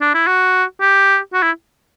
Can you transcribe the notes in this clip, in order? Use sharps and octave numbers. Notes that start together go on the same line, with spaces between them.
D4
E4
F#4
G4
F#4
E4